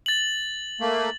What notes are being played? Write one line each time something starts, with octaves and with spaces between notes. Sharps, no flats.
A6 F#7
A3 A#3